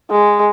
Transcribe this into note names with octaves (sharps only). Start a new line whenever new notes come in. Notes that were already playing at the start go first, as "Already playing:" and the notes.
G#3